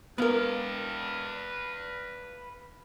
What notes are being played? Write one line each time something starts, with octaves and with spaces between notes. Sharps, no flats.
B3 A#4 B4 F5